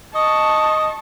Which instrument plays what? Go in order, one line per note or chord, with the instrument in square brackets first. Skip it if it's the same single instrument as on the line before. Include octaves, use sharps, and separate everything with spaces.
[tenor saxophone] D#5 [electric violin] A5 C#6